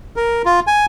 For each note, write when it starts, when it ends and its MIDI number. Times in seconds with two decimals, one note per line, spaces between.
0.16 0.42 70
0.46 0.60 65
0.67 0.86 80